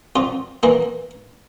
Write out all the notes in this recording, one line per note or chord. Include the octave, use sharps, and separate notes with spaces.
F2 F4
E3 A#3